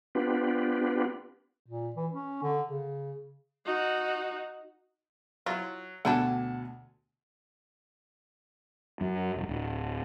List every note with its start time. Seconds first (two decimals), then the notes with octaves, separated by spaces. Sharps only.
0.15 B3 C4 D4 F4 G4 B4
1.67 A#2
1.96 E3
2.14 C#4
2.43 D3
2.67 C#3
3.65 D#4 F#4
5.46 F#3 E4 F4
6.05 D2 B2 A3 D4 G4 F#5 G#5 A5
9.01 F#2
9.36 D#1
9.49 D1